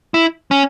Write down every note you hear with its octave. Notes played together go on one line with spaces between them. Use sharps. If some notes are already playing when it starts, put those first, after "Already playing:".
E4
C#4